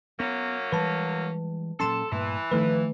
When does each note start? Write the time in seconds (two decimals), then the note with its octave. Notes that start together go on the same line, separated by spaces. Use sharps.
0.20 F#3 A#3 B3 C#4
0.72 E3 G3 G#3 B4 A5
1.80 A#2 F#3 C#4 A4 A5 C6 E7
2.12 G2 A#2 E3 A3
2.51 D#3 F3 A3 B4